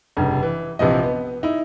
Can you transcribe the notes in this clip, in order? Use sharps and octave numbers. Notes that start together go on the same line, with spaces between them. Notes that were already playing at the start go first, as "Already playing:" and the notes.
F1 G2 C#3
E3
A#1 C3 E3 F3 D#5
B3
D#4 E4